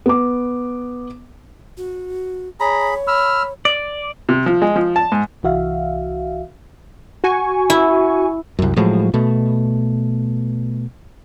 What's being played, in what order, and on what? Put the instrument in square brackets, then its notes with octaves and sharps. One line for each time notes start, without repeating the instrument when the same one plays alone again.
[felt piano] B3 D6
[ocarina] F#4
[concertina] G#4 B5 [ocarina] C#5 [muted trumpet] A#5
[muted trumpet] B5 [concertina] E6 F6
[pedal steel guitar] D5
[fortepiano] C3
F3
G#3
F3
A5
G#2
[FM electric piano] C2 E3 F#4 E5 F5
[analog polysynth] F#4 G#5 C#6
[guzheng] E4
[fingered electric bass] C2 F#2
A2 F3 F#3 G#3
B2 A3